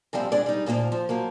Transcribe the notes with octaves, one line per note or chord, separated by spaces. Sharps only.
A#2 F3 G3 C4 E4
G#3 D4 D5
G3 D#4
D2 A#2 F3 A#3
F3
F3 F#3 A#3